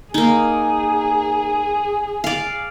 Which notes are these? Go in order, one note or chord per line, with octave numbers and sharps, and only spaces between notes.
A#3 D#4 G#4
D5 F5